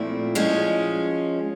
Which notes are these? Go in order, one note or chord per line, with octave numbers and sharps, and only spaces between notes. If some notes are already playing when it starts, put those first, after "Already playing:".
Already playing: A#2 F3 A3 C4 E4
F3 G#3 C#4